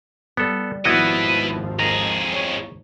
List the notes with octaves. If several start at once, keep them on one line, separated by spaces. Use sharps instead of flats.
G3 B3 A4
G#1 D#2 F3 B3 E4 F#4 B4 D#5
F2 D#3 G#4 A#5
C#5